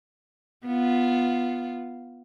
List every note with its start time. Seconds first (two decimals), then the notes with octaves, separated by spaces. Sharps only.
0.66 B3 F4